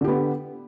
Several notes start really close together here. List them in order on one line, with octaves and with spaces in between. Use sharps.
D3 G4 B3